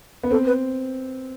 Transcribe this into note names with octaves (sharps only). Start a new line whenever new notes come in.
B3
C4 A4
B4